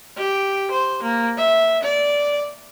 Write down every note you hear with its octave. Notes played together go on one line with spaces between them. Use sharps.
G4
C5
A#3
E5
D5